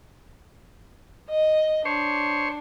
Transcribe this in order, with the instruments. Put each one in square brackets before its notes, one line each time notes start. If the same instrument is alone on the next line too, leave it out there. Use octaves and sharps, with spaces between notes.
[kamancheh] D#5
[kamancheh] D4 [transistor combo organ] C5 C#5